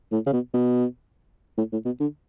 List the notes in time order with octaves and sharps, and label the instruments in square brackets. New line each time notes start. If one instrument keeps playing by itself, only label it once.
[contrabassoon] A2
C#3
B2
B2
A2
A2
B2
D3